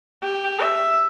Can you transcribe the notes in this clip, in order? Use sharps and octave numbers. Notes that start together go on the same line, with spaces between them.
G4
E5